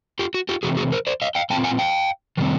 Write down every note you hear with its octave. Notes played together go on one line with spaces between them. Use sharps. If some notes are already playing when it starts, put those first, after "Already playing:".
F4 G4
F#4
F4 G4
C3 E3 A3 C4 F#4 G#4
F#4 G#4
A#4 C5
C5 D5
D#5 F5
F5 G5
A#2 G3 C4 F4 G5 A5
F#5 G#5
F5 G5
C3 D#3 G3 C4